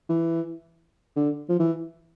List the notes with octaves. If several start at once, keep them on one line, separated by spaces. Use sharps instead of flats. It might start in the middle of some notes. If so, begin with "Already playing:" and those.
E3
D3
F3
E3